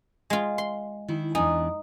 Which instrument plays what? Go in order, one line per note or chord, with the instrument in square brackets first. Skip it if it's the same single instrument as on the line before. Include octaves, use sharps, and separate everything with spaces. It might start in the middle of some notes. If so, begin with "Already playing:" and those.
[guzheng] G#3 F4
C6
[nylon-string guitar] D#3 E4
[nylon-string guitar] E2 D4 G#5 [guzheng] D#4